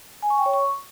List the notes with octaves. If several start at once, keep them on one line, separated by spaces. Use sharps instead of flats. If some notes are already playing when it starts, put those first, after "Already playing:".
G#5
C#6
G5
C#5
C#6